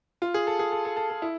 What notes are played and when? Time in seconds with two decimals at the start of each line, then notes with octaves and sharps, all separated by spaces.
0.22 F4
0.34 G#4
0.47 A4
0.59 G#4
0.72 A4
0.85 A4
0.96 A4
1.10 A4
1.22 E4